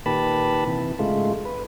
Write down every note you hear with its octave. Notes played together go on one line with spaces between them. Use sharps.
A#2 D#3 G4 B4 A5 B5
C3 E3
G#2 C#3 G#3 A3 F4
B4